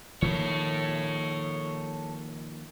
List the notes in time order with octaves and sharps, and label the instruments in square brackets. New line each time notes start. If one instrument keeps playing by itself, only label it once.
[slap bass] D#3 F3 A#3 [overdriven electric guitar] A4 C#5